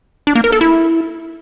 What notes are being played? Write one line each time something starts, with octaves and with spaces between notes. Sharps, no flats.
D4
A#3
A#4
A4
E4